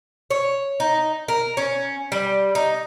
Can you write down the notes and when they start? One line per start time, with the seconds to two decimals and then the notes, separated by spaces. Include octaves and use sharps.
0.31 C#5
0.80 D#4
1.28 A#4
1.57 C#4
2.12 G3
2.55 D#4